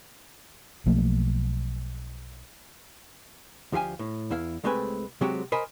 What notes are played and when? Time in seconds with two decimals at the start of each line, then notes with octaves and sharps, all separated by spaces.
0.86 B1 F3 A3 A#3
3.72 D2 F3 G4 F5 G#5
3.99 A2
4.30 E2 E4 F5
4.64 C2 G#3 A3 C4 B4 G#5
5.21 C3 F#3 G#3 C4 F#4 G4
5.52 A#4 C5 D#5 G#5 B5